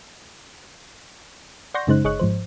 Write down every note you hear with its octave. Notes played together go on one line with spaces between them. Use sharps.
D5 F#5 C6 C#6 G6 A#6
F#2 C#3 G#3 D#4 C5 F#6
G1 G#4 C#5 D#5 C#6 F#6
G#2 F3 C5